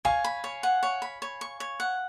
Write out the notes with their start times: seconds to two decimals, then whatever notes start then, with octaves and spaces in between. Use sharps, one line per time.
0.05 C#5 F5 G#5
0.25 B5
0.44 C#5
0.63 F#5
0.83 C#5
1.02 B5
1.22 C#5
1.41 C#6
1.60 C#5
1.80 F#5